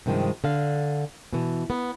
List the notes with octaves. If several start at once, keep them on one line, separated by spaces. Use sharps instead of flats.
G2 C3 D#3 F3 G#3
D3 F5
B2 E3
B3